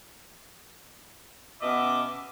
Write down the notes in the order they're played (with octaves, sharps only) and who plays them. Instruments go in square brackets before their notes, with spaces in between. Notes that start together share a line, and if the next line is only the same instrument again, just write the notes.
[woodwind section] B2 B3 C#4 D#5 E5 D6